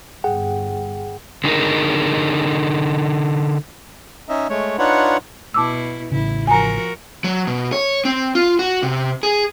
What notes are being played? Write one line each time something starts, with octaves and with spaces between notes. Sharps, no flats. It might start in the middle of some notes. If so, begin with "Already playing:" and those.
G1 G2 G3 G#4 F#5 G5
D3 D#4 G#4 A#4
C#4 D#4 D#5 E5
G#3 A3 C#5
D4 D#4 F4 B4 C#5 F#5
B2 E4 A5 D6 E6
A1 C#3 E4
F3 F#4 A#4 G#5 A#5
F#3
B2
C#5
C4
F4
F#4
C3
G#4